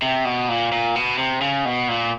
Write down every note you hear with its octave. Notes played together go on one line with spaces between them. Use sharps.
C3
B2
A#2
A#2
B2
C3
C#3
B2
A#2